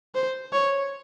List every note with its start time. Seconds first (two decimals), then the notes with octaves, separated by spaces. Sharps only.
0.15 C5
0.53 C#5